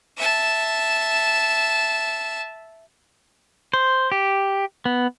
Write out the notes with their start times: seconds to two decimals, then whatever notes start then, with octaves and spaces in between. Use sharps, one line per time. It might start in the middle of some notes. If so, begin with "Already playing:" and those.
0.17 E5 A5
3.74 C5
4.12 G4
4.86 B3